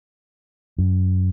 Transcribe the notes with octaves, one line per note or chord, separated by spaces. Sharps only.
F#2